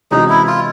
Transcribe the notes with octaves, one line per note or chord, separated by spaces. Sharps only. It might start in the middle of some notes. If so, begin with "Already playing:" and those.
C3 E3 G#3 C#4 D#4 F#4
E4
F4